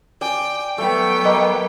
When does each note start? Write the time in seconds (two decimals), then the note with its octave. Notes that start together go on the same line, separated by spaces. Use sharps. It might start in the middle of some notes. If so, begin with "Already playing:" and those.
0.21 D5 G5 G#5
0.78 F#3 A3 B3 G5
1.25 A#3 D#5